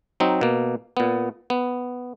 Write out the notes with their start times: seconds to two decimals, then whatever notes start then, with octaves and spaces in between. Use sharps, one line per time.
0.20 F#3 C4 D#4
0.41 B2 A#3
0.97 A#2 B3
1.50 B3